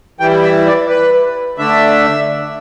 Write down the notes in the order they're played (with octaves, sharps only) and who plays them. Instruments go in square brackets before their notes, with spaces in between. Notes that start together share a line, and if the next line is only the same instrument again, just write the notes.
[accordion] E3 G3 E4 G5
E5
D5
B4
D3 A3 D4 E5